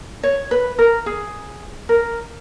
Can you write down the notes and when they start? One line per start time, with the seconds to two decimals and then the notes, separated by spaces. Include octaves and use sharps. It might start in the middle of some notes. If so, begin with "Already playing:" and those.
0.23 C#5
0.51 B4
0.79 A#4
1.06 G#4
1.89 A#4